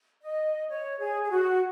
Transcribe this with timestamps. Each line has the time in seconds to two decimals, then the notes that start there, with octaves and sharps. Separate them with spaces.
0.21 D#5
0.69 C#5
1.00 G#4
1.22 G#4
1.31 F#4